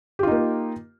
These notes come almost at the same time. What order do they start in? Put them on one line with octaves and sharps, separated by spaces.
G4 F4 D#4 A#3